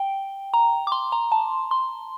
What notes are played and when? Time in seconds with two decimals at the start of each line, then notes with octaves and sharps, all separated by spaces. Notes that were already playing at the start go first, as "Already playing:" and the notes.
Already playing: G5
0.54 A#5
0.87 D6
0.92 C6
1.12 A#5
1.32 A5
1.71 C6